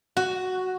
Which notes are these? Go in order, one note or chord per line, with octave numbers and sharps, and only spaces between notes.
F#4